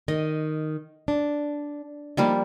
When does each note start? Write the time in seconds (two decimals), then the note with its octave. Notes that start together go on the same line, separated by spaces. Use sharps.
0.08 D#3 D#5
1.08 D4
2.17 F3 G3 A#3 D#4